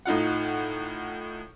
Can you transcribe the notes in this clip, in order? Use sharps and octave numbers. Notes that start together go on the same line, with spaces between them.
A2 D#4 F4 F#5